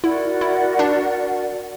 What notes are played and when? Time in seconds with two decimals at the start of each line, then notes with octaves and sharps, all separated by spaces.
0.03 E4 F#4 A#4 D5 F#5
0.41 E4
0.79 D4